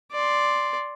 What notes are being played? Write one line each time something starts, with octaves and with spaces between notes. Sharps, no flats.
D5 C6